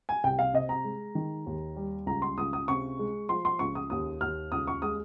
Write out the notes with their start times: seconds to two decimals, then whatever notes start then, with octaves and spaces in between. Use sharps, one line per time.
0.09 G#5
0.24 C2 G5
0.39 F5
0.54 C3 D#5
0.69 A#5
0.84 G#3
1.15 D#3
1.46 D#2
1.76 G3
2.06 C#2 A#5
2.22 C6
2.38 C#2 D#6
2.53 D#6
2.68 C3 C#6
2.99 G#3
3.29 F3 C6
3.45 C6
3.59 C#2 C#6
3.75 D#6
3.90 D#2 D#6
4.21 D#2 F6
4.52 C#2 D#6
4.67 C#6
4.82 G#3 D#6